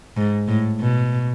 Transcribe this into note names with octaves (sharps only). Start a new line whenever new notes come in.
G#2
A2
B2